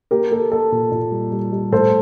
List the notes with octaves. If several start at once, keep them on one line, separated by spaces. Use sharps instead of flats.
A#3 G4 A#4
A#3 A4
A#3 A4
A#2
A#2
G3
G3
G3
A2 A4 C5